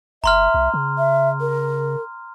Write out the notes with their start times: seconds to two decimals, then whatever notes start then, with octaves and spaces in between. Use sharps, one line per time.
0.24 G1 E5 A#5 C6 F6
0.54 C2
0.74 C#3
0.98 E5
1.41 A#4